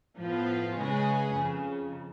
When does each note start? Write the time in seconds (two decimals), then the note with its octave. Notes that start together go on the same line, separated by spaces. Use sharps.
0.20 A2 F3 B3 F4 B4
0.77 C#3 G#3 C#4 G#4 B4
1.34 F2 C#3 F3